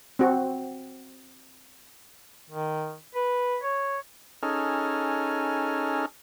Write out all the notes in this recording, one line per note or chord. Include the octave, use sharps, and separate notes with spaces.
C4 F#4
D#3
B4
C#5
C#4 D#4 G#4 A4 F6